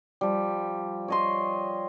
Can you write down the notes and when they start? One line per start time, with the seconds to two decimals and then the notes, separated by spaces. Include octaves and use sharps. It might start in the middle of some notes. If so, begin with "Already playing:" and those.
0.21 F3 G3
1.08 C#5 D#5 C6